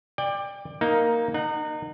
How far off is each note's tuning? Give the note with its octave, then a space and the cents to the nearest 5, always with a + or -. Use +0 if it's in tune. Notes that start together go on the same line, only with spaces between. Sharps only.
D5 +15 G5 +30
A#3 +0 D#4 +10
D#4 -30 F#5 +0